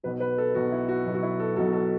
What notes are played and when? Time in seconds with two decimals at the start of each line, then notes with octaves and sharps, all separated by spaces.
0.03 B1 B2 F#3 B4
0.20 B4
0.38 A4
0.55 B1 B2 F#3 F#4
0.72 E4
0.89 F#4
1.06 B1 B2 F#3
1.15 F#4
1.23 E4
1.40 A4
1.56 B1 B2 F#3 A4
1.73 A4